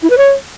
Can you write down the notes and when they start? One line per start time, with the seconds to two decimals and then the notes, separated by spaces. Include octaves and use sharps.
0.03 E4
0.10 B4
0.18 C#5